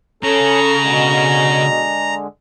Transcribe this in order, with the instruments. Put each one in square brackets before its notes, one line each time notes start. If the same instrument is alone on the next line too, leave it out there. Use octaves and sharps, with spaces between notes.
[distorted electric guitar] C#3 [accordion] C#4 [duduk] A4 [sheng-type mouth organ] A#5
[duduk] B2 [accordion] D3 G#3